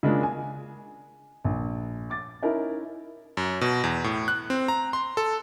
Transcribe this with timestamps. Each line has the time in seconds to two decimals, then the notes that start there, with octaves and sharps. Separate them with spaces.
0.03 C#3 G#3 A#3 D4 F4
0.23 G#5
1.44 A#1
2.10 D6 A6
2.42 C#4 D#4 E4 A#4
3.37 F#2
3.61 B2
3.84 E2
4.04 A2
4.28 F#6
4.50 C4
4.68 A#5
4.93 C6
5.17 A4